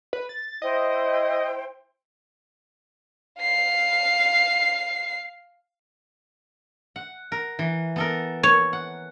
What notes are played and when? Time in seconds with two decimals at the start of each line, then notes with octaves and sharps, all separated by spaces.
0.13 B4
0.29 A6
0.62 E4 C5 D#5 G5
3.41 F5 C7
6.96 F#5
7.32 A#4
7.59 E3
7.96 B3 A4 A#4
8.43 C#5
8.73 F#5